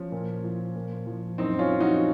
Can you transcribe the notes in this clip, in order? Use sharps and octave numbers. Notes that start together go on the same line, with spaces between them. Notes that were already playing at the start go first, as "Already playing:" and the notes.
Already playing: F3 C#4
A#2
F3
A#2
F3
F#2 C4 D#4
C#4 F4
F3
D#4 F#4